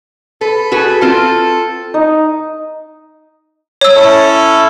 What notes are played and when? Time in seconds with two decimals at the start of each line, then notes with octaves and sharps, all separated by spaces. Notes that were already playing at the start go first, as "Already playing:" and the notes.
0.41 A4 B4
0.72 F#4 G#4 B4
1.01 C4 F4 A4 C5
1.94 D#4
3.81 C#5 E6
3.96 C#4 E4 A4